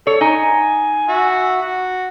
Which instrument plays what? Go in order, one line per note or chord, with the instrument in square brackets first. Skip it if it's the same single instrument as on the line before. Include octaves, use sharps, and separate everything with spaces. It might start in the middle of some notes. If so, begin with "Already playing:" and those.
[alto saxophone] A4 [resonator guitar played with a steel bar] C#5
[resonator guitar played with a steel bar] D#4 [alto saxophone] G#5
[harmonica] F#4 E5
F#4